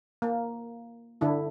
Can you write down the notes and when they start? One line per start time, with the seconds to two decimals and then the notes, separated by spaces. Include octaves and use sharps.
0.22 A#3
1.21 D3 D4 E4